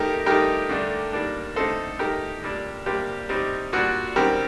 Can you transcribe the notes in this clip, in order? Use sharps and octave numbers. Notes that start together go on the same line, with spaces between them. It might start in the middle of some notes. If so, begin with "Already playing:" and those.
Already playing: D#3 A3 D#4 G4 A#4
G2 D#3 A3 D#4 G4 A#4
G2 D3 A3 D4
D#3 G3 A#3 D4
D3 A3 C4 D#4 A4 C5
D#3 A3 D#4 G4 A#4
A#2 G3 D4
C3 G3 A#3 D4 G4
C3 G3 C4 D#4
A#2 G3 D4 F#4
F#2 D#3 G3 C4 G4 A#4